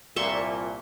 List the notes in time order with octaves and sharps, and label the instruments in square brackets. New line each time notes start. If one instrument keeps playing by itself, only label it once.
[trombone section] C2 A#2 [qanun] E5 C6 C#6